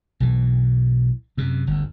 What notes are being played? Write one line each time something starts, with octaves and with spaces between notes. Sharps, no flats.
B1 E3
F#2 C3
G1 D2